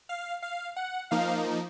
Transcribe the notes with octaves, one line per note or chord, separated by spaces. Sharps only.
F5
F5
F#5
F3 A#3 D#4 F5